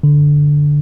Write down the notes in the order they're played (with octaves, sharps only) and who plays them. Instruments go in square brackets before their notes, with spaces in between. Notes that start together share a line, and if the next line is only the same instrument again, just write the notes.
[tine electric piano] D3